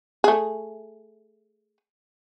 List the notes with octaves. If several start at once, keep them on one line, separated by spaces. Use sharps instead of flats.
A3 G#4